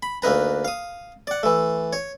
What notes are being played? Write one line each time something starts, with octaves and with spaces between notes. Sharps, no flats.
B5
D2 A#3 D#4 B4 A#5
F5 D#6
D5 F#5
E3 A3
C#5